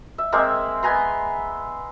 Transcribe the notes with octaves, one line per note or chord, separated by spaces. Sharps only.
E5
G#3 A#3 C4 E5
B3 G#5 A#5 C6